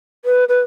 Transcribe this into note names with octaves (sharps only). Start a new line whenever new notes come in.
B4
B4